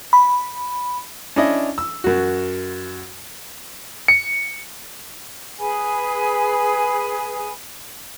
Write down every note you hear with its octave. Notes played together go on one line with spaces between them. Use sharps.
B5
C#4 D4 E4 D#5
E6
F#2 F#4
C#7
G#4 B4 G#5 B5